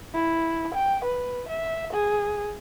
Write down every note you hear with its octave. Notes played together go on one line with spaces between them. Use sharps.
E4
G5
B4
E5
G#4